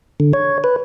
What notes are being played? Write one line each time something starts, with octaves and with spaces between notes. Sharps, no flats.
D3
C#5
B4